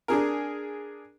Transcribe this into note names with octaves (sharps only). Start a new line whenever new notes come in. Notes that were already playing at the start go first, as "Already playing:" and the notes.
D4 G#4 A#4